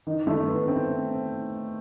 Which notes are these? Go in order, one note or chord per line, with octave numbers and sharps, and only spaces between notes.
D#3
A3
B3
C4